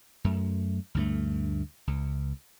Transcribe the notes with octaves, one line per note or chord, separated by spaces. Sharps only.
F#2 A3
D2 G2 A3
C#2